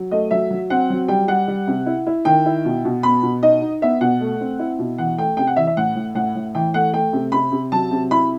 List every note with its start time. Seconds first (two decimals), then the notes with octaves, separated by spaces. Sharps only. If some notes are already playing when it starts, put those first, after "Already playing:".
Already playing: F#3
0.11 A3 D#5
0.31 F#3 E5
0.50 F#3
0.70 C4 F#5
0.90 F#3
1.08 G3 G5
1.28 G3 F#5
1.48 G3
1.67 C3
1.86 E4
2.07 E4
2.25 D#3 G5
2.46 E4
2.65 B2
2.85 B2
3.03 B3 B5
3.23 B2
3.43 D#4 D#5
3.62 D#4
3.82 B3 E5
4.01 B2 F#5
4.21 A3
4.41 C4
4.59 E4
4.79 B2
4.98 E3 F#5
5.18 A3 G5
5.37 C3 G5
5.47 F#5
5.56 E3 E5
5.67 E5
5.77 A2 F#5
5.95 A2
6.15 A2 F#5
6.35 A2
6.55 E3 G5
6.74 A3 F#5
6.93 A3 G5
7.13 C3
7.32 C3 B5
7.52 C3
7.72 F#3 A5
7.91 C3
8.11 E4 B5